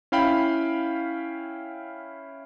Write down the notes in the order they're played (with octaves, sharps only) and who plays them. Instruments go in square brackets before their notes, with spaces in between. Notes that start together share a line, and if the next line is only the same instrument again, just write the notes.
[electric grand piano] C#4 E4 F5 G5 B5